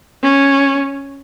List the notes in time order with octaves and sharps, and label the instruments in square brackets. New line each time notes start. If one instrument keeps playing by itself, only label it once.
[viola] C#4